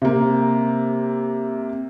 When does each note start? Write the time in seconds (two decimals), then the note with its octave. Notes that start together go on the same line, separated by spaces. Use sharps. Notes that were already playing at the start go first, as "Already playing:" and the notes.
0.02 C3 A#3